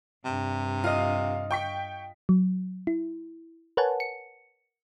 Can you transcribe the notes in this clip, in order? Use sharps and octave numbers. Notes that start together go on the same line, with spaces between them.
G2 C3
F4 D#5 F5
G5 C#6 B6
F#3
E4
A#4 B4 C#5 F#5 G#5 A5
C#7